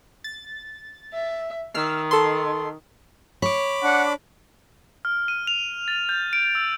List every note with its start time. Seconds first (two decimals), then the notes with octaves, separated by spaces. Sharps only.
0.24 A6
1.13 E5
1.75 D#3 E6 F6 C7
2.11 A4 C6
3.42 C#5 B5 D6
3.83 D4 F#5
5.05 F6
5.28 D#7
5.47 F7
5.88 A6
6.09 G6
6.33 D7
6.55 E6